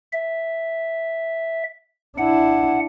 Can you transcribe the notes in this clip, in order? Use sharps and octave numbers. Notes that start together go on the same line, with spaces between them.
E5
D4 E4 F#5